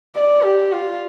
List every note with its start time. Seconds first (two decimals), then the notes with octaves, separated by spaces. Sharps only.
0.15 D5
0.44 G4
0.72 F4